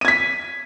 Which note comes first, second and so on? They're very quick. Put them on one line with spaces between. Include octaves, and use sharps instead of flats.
D#7 G#6 B6